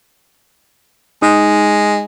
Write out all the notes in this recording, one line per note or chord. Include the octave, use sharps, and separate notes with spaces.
G#3 D#4